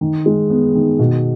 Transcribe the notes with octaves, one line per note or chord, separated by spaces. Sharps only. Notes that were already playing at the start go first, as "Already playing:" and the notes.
D#3
G#3
B3
D#3
B2